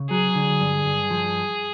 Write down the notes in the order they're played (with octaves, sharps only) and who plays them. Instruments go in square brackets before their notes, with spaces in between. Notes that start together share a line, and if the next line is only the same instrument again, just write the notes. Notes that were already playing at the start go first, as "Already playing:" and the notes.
Already playing: [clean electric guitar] C#3
[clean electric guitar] F#3 [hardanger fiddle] G#4
[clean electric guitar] D3
G2
G2
F3